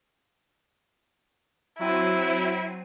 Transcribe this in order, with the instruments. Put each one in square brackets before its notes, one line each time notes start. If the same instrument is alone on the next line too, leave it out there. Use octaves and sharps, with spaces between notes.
[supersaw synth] F#3 C4 D#7 [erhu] E4